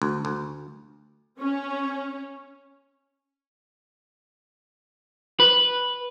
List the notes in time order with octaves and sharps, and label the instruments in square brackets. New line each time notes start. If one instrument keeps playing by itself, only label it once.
[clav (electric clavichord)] D2
D2
[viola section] C#4
[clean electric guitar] B4